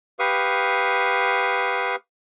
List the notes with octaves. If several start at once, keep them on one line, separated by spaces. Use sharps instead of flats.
G4 B4 F5 C#6 D#6